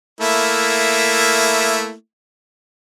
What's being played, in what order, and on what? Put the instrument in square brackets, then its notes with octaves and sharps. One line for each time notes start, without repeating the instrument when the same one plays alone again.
[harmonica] A3 A#3 E4